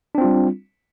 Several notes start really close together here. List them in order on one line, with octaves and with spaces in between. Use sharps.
D4 C4 F4 G3